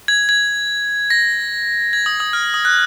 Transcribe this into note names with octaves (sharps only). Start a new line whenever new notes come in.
G#6
G#6
A#6
G#6
D#6
D#6
F6
D#6
F#6